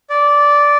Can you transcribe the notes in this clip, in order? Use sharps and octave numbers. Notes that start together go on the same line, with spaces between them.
D5